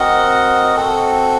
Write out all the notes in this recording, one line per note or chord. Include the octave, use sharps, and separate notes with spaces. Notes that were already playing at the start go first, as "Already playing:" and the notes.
Already playing: C4 F#4 A#4 D#5 F#5
C4 F#4 A4